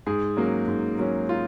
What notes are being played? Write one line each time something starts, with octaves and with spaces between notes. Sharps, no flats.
G#2 G#4
F#3 A#3 C#4
G#2
F#3 A#3 C#4
F4